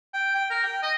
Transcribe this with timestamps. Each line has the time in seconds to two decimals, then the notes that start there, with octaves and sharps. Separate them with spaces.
0.14 G5
0.35 G5
0.50 A#4
0.63 G5
0.83 D#5